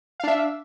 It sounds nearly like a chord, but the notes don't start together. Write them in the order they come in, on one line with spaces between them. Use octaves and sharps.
F5 D4 E5